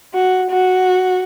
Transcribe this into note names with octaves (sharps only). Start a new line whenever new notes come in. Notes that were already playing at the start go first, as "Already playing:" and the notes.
F#4
F#4